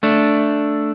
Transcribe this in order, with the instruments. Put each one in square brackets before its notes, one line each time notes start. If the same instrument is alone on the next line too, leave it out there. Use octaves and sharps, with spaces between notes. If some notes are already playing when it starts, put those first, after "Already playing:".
[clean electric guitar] A3 D4